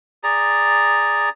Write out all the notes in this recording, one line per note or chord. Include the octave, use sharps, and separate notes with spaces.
G#4 D5 A#5